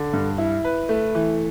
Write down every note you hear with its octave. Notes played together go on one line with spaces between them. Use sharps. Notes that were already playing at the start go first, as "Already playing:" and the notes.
Already playing: D3
G2
E4
B4
A3
E3